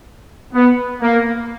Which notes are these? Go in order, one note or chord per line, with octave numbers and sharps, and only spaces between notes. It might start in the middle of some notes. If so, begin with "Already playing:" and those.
B3
A#3